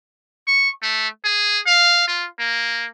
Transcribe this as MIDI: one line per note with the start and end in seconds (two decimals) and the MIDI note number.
0.47 0.69 85
0.82 1.08 57
1.24 1.60 68
1.67 2.07 77
2.08 2.27 65
2.39 2.86 58